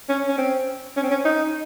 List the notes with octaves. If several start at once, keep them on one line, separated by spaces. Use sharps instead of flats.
C#4
C#4
C4
C#4
C4
C#4
D#4